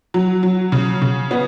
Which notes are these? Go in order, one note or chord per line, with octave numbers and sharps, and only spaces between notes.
F#3
F#3
C#3
C#3
B3